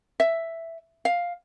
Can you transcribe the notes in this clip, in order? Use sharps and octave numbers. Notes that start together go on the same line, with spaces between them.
E5
F5